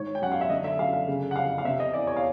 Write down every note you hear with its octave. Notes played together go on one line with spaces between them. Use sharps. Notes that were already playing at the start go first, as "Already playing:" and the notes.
Already playing: G#2 D#3 C#5
G5
F#2 F#5
F5
E5
D3 D#5
E5
F#2 F5
F5
C#3
F#5
F2 F5
F5
C3 E5
D#5
E2 D5
C#5
F5